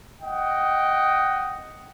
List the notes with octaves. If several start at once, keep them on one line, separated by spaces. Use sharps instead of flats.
D#5 F#5 G5